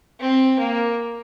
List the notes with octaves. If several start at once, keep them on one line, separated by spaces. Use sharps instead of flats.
C4
A#3